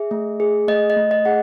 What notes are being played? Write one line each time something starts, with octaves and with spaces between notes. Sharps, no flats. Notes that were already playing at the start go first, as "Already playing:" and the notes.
Already playing: G#4 E5
A3
G#4
A3 D#5
D#5
A3
D#5
G#4 F#5